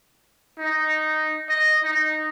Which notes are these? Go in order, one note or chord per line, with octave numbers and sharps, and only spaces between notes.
D#4
D#5
D#4